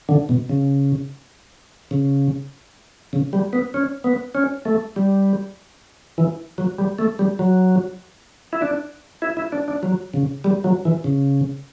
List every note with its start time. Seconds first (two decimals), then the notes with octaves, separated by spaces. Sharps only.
0.09 D3
0.29 B2
0.49 C#3
1.91 C#3
3.13 C#3
3.33 G3
3.53 B3
3.74 C#4
4.04 B3
4.35 C#4
4.65 A3
4.96 G3
6.18 E3
6.58 F#3
6.78 G3
6.99 A3
7.19 G3
7.39 F#3
8.53 E4
8.62 D4
9.22 E4
9.37 E4
9.52 D4
9.68 D4
9.83 F#3
10.14 C#3
10.44 G3
10.64 F#3
10.85 E3
11.04 C#3